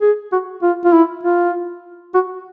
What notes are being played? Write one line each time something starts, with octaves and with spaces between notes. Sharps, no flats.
G#4
F#4
F4
F4
E4
F4
F#4